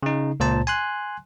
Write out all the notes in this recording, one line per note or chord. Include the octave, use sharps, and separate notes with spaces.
C#3 D#4
C#2 A#2 C5 A5
G#5 C6 F#6